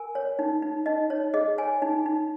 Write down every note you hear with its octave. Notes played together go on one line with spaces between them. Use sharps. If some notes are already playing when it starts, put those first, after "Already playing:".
Already playing: A#4 G#5
C#5
D#4
D#4
D#4 D#5
D#4 C#5
G#4 D#5
C#5 G#5
D#4
D#4